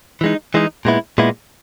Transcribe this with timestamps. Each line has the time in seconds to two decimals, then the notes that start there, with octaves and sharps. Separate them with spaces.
0.21 E3 G#3 D#4
0.54 E3 G#3 D#4
0.85 A#2 G#3 B3 E4
1.18 A#2 G#3 B3 E4